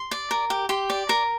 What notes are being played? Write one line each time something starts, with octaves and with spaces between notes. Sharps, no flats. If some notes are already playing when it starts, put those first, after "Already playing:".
Already playing: C6
D5
A#4
G4
G4 C6
D5
A#4